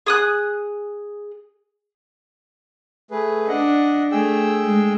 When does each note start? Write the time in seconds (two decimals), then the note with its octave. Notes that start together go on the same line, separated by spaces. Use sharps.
0.06 G#4 D#6 F#6
3.11 A3 G#4 B4
3.48 D4 D#5 F#5
4.12 A3 G#4 G5 E6
4.64 G#3